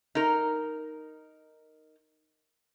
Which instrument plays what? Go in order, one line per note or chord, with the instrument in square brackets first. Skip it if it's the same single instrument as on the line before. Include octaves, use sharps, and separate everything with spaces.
[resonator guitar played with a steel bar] D#4 A#4